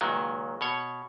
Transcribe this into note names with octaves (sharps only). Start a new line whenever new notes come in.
C#2 A#2 D#3 F#3
B2 C#5